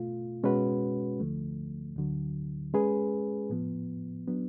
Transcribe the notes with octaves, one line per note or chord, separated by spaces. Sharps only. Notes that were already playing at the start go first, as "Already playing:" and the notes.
Already playing: B2 A3 F4
B2 G#3 C#4 F#4 B4
D2 D3 F3 A3
D2 D3 F#3
G#3 C#4 G#4 B4
A2 F3 B3
F#3 B3 D4